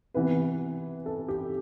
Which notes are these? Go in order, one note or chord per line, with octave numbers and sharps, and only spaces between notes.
C3 E3 B3 B4
A4
G4